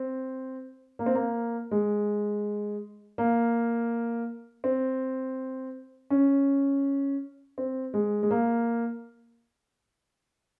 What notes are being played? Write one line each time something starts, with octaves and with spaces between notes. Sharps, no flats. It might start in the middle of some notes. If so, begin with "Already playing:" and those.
Already playing: C4
A#3
C4
A#3
G#3
A#3
C4
C#4
C4
G#3
G#3
A#3